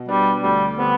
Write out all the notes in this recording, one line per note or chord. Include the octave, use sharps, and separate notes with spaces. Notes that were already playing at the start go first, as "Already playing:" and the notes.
Already playing: B2
G3 B3 D4
D2 G3
D3 G3 B3 C4